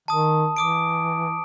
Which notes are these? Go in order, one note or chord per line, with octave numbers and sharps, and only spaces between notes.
D#3 A5 D#6
E3 D6 D#6 D7